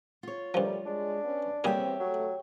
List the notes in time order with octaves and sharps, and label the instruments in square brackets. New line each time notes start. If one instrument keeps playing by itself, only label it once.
[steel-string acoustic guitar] F4 C#5
[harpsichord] G2 F3 [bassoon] G3 [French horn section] A3 A#4
[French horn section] G#3 [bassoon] D4
[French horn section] B3 C#4
[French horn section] E2 C4 [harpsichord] A#2 G3 G#4 [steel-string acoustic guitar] G4 C#5 E5
[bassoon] F#3 [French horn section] A3